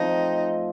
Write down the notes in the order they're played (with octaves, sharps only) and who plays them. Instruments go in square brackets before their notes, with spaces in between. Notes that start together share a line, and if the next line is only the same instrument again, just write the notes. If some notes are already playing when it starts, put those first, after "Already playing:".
Already playing: [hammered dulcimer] F3 A3 C4 F4 [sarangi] D#4